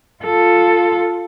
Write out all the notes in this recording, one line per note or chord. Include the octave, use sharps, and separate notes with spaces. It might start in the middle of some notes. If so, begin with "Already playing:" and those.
F4 A4